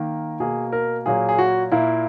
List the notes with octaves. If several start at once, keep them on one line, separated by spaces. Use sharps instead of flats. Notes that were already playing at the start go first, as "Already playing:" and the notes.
Already playing: D#3 A#3
B2 A#3 G#4
A#4
A#2 F#3 A#3 G#4
G#4
F#4
A#2 A#3 E4